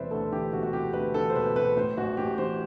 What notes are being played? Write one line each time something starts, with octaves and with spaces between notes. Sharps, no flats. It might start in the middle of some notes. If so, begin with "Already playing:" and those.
Already playing: E1 D2 C3 E3 B4 C5 D5 E5
D2 A4
E3 G4
E1 F#4
F#4
C3 G4
D2 B4
E3 A4
C5
E1 B4
C3 B4
A2 C5
A1 F#4
A1 G4
E3 C5